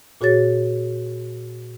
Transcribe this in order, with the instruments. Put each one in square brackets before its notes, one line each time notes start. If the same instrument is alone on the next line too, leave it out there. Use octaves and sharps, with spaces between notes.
[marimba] A#2 F#4 G#4 C#5 A6